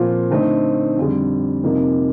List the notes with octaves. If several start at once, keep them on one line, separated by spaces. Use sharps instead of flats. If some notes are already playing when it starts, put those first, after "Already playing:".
Already playing: A#2 F3 C4 F4
D3 A3 C4 D#4
F2 D3 G3
F2 C3 F3 A#3 D#4